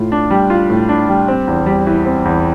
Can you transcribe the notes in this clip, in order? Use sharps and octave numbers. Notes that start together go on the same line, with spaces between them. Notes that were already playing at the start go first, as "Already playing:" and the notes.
Already playing: A2 F4
D4
G3
F4
A2
D4
G3
C4
E2
G3
E3
C4
E2